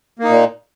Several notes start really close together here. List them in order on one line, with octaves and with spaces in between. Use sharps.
A#3 D#4 A#2